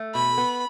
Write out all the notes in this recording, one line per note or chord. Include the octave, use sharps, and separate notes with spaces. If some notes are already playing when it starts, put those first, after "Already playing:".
Already playing: A3
B2 B5
B3